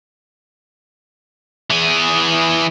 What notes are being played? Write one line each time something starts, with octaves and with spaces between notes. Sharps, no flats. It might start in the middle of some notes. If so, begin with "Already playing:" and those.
E3 G#4